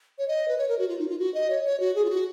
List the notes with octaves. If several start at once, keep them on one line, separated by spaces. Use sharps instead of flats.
C#5
D#5
B4
C#5
A#4
F#4
F4
D#4
F4
F#4
D#5
C#5
C#5
F#4
G#4
F4
F#4